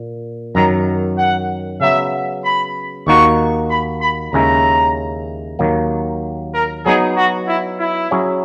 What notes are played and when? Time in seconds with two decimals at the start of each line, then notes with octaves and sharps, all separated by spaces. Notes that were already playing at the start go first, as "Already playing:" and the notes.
Already playing: A#2
0.55 F#2 D#3 F#3 A#5
1.18 F#5
1.81 C#3 F#3 B3 E5
2.45 B5
3.07 D#2 D#3 A#3 D#4 F#4 C#6
3.70 B5
4.01 B5
4.33 D#2 C#3 G#3 C#4 E4 A#5
5.59 D#2 D#3 F#3 A#3
6.54 A#4
6.86 F#3 B3 D#4 G#4
7.17 F#4
7.48 E4
7.80 E4
8.11 F#3 C#4 E4 G#4 C#5